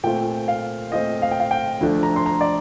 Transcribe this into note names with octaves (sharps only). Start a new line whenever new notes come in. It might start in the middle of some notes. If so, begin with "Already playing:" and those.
A#2 A3 C4 F4 G5
F5
A#2 A3 C4 F4 D#5
F5
G5
F5
G5
D2 D3 F3 A3 D4
A#5
C6
A#5
D5